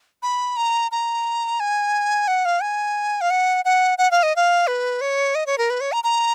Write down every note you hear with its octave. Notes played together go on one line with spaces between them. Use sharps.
B5
A#5
A#5
G#5
F#5
F5
G#5
F5
F#5
F#5
F#5
F5
D#5
F5
B4
C#5
D#5
C#5
A#4
B4
C#5
A#5
A#5